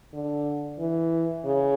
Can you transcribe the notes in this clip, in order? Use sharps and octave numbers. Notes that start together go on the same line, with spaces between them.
D3
E3
C#3